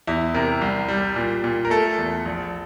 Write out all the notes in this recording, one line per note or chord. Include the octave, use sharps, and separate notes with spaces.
E2 E4
C3 A#4
C2
G3
A#2
A#2
A#4
A3 A4
E2
A#1